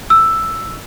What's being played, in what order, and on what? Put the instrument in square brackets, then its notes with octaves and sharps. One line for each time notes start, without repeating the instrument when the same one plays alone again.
[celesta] E6